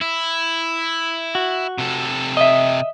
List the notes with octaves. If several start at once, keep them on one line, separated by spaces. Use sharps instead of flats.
E4
F#4
C3 A4
D#5 E5